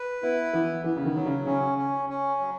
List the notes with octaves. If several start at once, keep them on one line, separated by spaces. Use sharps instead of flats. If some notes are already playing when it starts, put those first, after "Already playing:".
Already playing: B4
B3 E4
E3 B3
E3 B3
C#3
D#3
F#3
C#3
C#3 C#4
C#4
C#4
F#3